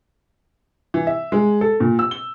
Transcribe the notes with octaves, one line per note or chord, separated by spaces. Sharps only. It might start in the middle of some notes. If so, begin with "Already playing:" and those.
E3
E5
G#3
A4
A#2
E6
G7